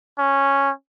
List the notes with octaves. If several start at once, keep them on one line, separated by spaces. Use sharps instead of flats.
C#4